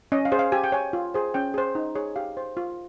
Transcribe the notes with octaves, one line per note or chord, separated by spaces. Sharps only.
C#4 D#5
F5
G#4 C5
F5
G4 G#5
G5
C#5 G#5
F4
G#4 C5
C#4 G5
G#4 C5
D#4
G#4 C#5
G4 F5
C5
F4